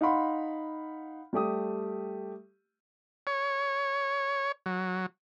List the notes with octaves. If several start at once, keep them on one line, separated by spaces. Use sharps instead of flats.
D#4 F5 F#5 B5 C6
G3 A3 G4 D#6
C#5
F#3